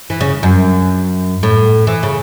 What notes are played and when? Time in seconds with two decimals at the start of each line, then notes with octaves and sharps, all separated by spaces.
0.10 E3
0.21 C#3
0.43 F#2
1.43 A2
1.87 E3
2.03 C#3